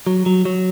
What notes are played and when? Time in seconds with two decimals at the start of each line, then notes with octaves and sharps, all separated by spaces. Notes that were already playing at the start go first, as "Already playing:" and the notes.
0.07 F#3
0.26 F#3
0.45 F#3